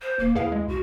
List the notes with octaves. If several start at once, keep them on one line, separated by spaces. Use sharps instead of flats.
C5
D1 A#3
D#2 E4 G#4 B4 F5
G#3
C2 F#4